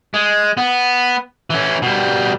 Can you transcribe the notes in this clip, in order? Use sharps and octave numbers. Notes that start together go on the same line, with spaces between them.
G#3
B3
E3 C#4
B2 G3